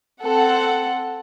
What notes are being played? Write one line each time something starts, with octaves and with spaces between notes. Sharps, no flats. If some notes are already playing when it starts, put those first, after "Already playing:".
C4 A4 F#5